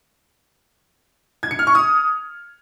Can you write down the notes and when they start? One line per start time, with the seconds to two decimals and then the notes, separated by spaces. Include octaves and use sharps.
1.43 G#6
1.51 C#7
1.59 F6
1.67 C#6
1.75 D#6